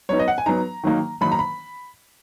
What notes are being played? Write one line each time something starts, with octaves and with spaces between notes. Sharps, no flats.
F#3 B3 D#4 C#5
D#5
F#5
G#5
F#3 B3 D#4 A#5
D#3 F#3 A#3 D#4
D#3 F#3 A#3 D#4 B5
A#5
B5